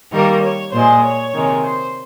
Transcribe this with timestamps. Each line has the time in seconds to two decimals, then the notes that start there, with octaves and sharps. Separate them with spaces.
0.12 D#3 G3 A#3 A#4
0.42 C#5
0.72 A#2 G#3 C5
1.03 C#5
1.33 C3 D#3 G#3
1.63 C5